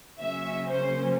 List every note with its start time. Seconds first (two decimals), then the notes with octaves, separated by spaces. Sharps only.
0.20 C#3 F#3 A#3 C#4 E5
0.66 C5